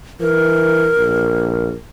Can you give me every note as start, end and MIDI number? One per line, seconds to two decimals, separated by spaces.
0.21 0.91 52
0.21 1.70 70
0.97 1.74 34